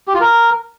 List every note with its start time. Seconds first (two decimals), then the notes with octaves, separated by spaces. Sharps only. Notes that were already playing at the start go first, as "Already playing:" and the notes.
0.08 G4
0.14 F4
0.20 A#4